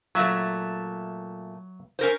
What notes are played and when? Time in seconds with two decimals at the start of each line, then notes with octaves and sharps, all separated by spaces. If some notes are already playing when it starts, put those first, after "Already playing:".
0.15 A#2 F#3 A3 E5
1.99 C#4 A#4 C5